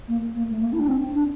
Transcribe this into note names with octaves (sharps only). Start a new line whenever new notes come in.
A#3
A#3
A3
A#3
E4
D4
C4
D4